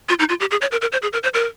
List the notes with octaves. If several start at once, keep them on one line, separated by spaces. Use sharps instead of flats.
F4
D#4
F4
G4
G#4
C#5
A#4
A#4
C5
G#4
A#4
C5
A#4